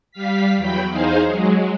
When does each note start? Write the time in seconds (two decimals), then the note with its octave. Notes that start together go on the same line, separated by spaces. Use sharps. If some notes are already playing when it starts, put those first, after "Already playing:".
0.11 G3 F5 B6
0.57 E2 F#3 G5 B5
0.88 E2 D#4 G#4 C5 F5
1.26 F#3 G#3